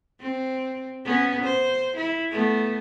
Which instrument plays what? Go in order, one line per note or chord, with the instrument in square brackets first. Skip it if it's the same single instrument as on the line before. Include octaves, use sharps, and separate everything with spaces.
[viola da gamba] C4
B3 C#4
C5
E4
A3 B3